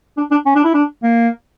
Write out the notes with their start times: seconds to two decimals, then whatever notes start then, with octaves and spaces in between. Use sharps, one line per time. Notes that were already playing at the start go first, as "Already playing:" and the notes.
0.17 D4
0.31 D4
0.46 C#4
0.55 D4
0.64 E4
0.74 D4
1.03 A#3